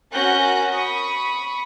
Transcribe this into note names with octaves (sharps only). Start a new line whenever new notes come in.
C#4 F#4 A#4 F#6 G6 A#6
B5 C#6 D#6